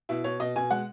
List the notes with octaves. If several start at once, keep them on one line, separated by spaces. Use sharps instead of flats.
B2 E4
B2 C#5
B2 D#5
B2 G#5
G#3 F#5